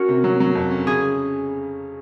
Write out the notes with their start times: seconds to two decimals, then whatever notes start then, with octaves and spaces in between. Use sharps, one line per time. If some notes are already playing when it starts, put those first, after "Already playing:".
Already playing: C#4 F#4 A#4
0.09 C3
0.24 F#3
0.40 F#3
0.55 F2
0.71 C#4
0.87 C#3 G#4